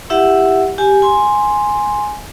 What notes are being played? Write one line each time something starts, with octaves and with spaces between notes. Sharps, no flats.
E4 G4 E5 F#5
G4 G#5
G#5 C6